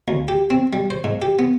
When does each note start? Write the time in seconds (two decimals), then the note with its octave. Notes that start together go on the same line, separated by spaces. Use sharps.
0.08 D2
0.28 G4
0.50 C4
0.73 G3
0.90 C5
1.04 G#2
1.22 G4
1.39 B3